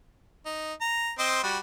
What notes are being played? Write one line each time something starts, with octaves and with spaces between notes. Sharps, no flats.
D#4
A#5
C4 C5 D#5
G3 F#4